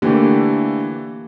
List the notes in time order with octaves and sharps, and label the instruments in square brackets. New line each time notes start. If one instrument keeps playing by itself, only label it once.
[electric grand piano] D3 E3 A3 [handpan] A#3 G4